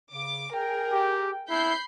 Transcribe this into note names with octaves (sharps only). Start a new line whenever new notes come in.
C#3 D6
G#4 A#4 G5
G4
B3 C4 D4 E4 B5 G6 C7